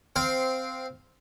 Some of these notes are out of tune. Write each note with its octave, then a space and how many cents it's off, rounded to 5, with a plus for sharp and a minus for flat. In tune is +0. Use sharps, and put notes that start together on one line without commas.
C4 -10 F5 +0